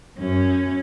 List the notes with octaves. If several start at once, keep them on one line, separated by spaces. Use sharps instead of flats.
F#2 C#4